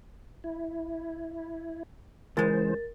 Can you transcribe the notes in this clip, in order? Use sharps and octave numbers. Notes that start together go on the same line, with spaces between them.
E4
C#2 E3 G#3 A#4 C5 A6